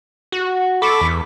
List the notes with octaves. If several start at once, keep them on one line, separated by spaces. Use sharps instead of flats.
F#4
A4 B5 C#6 D6
E2